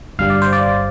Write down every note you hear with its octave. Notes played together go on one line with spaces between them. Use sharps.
G1 G2 G3 F5
D5
C5
D5